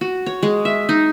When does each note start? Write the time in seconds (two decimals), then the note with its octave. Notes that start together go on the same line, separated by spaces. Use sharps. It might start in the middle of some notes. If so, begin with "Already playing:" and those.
0.01 F#4
0.26 C#5
0.43 G#3
0.65 E5
0.89 D#4